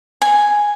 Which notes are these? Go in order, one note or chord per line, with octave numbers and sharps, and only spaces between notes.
G#5